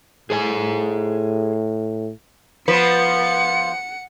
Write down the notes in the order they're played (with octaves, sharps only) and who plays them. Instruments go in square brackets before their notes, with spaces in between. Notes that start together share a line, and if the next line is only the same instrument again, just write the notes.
[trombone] A2 [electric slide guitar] G#4 C5 G#5
[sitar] F3 B3 [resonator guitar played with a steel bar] B4 [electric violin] F#5 C#7